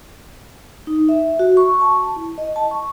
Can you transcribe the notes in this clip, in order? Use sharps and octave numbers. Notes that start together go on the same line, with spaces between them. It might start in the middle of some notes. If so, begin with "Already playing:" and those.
D#4
E5
F#4
C#6
A5
E4
D#5
A5
C#6